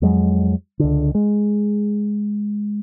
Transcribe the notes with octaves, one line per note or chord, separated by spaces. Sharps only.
F2 F#3 G#3
C#2 D3
G#3